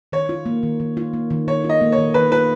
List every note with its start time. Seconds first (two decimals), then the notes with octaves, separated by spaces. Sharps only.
0.12 D#3 C#5
0.29 F4
0.46 A#3
0.63 D#3
0.80 D#3
0.97 F4
1.14 A#3
1.31 D#3
1.48 D#3 C#5
1.64 F4
1.69 D#5
1.81 A#3
1.92 C#5
1.98 D#3
2.14 D#3 B4
2.32 F4 B4